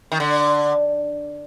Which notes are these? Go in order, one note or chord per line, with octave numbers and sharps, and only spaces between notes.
D#3
D3